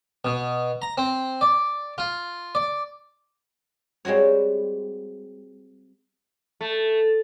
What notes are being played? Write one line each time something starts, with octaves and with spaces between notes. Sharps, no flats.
B2
A#5
C4
D5
F4
D5
G3 G#3 C4 F#4 C#5
A3